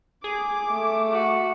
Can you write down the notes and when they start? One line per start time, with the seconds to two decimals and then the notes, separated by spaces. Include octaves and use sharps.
0.24 G#4 D6
0.71 A3
1.11 F#4